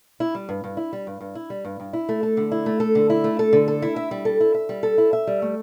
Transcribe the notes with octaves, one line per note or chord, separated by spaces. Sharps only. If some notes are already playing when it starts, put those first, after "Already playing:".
E4
G3
G2
G2
E4
G3
G2
G2
E4
G3
G2
G2
E4
A3
A4
D3
E4
A3
A4
D3
E4
A3
A4
D3
A4
E4
E5
G3
A4
E4
E5
G3
A4
E4
E5
G3
A3